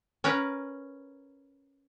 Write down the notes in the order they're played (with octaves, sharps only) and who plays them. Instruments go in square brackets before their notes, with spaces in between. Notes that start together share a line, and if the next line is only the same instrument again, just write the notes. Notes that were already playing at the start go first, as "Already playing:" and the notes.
[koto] C#4 A#4 B4 A#5